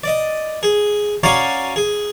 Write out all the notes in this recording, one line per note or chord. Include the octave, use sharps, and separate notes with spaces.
D5 D#5
G#4
C#4 F#4 D5 F5 G#5 A#5
G#4